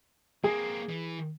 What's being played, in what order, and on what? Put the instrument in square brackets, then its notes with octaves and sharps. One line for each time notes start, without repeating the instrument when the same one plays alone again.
[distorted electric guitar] A#3 C4 [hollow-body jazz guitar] G#4
[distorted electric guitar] E3